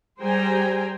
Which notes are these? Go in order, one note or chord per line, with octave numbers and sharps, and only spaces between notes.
G3 G#4 C5 G5 G#5 A#5